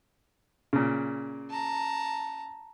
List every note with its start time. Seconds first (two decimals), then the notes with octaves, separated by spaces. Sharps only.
0.73 A#2 C#3
1.50 A5 A#5